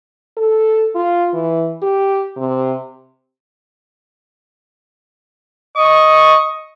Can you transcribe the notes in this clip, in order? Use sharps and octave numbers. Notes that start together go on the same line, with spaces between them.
A4
F4
E3
G4
C3
D#5 C#6